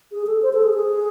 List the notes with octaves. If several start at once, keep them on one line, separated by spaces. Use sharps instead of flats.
G#4
A4
C5
A4
G#4
G#4